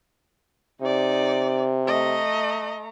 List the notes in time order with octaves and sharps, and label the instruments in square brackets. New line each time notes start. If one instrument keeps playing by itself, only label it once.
[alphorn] C3 [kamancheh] D#4 D5
[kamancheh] A3 A#5 [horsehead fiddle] D#5